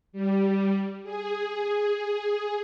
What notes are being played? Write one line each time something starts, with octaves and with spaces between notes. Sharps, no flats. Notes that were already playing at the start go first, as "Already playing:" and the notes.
G3
G#4